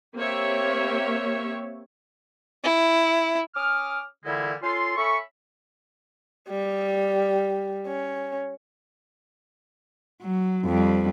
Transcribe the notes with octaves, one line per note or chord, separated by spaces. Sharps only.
A#3 C4 G4 C#5 E5
E4
C#4 D6 D#6 F6
A#2 D3 E3 G3 G#3 E4
C#4 F4 A4 C6
C#4 A4 E5 B5 C#6
G3
C#4
F#3
F2 G3